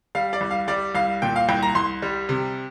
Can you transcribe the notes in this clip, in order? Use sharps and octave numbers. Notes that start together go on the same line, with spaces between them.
G3 F5
D5
C2
F5
G3 D5
C2 F5
A#2 G5
F5
C2 G5
A#5
C2 C6
G3
C3